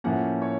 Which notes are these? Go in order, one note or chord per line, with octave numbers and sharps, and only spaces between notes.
A2 F3 A#3 C#4 F#5
C#5